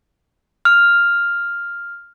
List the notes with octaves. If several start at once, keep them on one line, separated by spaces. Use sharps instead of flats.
F6